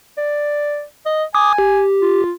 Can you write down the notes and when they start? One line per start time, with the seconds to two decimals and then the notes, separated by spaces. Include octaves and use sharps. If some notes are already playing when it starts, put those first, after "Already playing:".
0.18 D5
1.06 D#5
1.35 G#5 D6 D#6
1.58 G4
2.01 F4